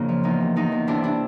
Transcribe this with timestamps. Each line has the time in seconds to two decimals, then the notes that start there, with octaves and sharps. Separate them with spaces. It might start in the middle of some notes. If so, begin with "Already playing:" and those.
Already playing: F2 C#3 A#3 D4 F4
0.09 F3
0.24 E2 D#4
0.40 C3
0.56 E2 D#4
0.72 E2
0.87 C3 D4 E4
1.03 D4 E4